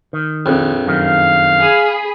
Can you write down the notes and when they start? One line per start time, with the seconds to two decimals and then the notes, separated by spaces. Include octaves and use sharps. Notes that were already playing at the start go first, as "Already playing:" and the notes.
0.13 D#3
0.46 A#1 F2
0.87 F#2 D#3 F5
1.58 G#4 B5